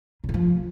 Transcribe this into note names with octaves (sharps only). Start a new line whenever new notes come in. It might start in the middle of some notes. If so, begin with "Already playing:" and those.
C#3
D#3
F3